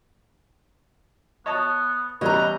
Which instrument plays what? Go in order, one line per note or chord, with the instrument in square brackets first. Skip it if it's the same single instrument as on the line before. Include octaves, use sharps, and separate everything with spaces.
[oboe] B3 [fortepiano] C#5 D#5 A5
[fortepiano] E2 G3 C#5 [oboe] B4 [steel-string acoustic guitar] D#5 A#5